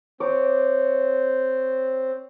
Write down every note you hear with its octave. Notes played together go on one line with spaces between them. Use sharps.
C4 C#5 D6